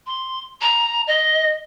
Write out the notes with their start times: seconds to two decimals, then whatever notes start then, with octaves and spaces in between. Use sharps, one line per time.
0.06 C6
0.61 A#5
1.07 D#5